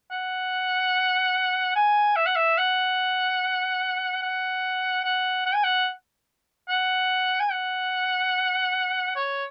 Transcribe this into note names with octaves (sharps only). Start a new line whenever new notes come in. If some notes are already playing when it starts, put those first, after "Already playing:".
F#5
G#5
E5
F#5
E5
F#5
F#5
F#5
F#5
G#5
F#5
F#5
G#5
F#5
C#5